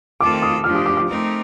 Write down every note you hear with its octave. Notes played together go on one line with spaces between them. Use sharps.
D#3 A3 C4 F4 A4 D6
D#6
F3 A3 D4 G4 F6
D#6
D6
D6
A3 C4 D#4 A#4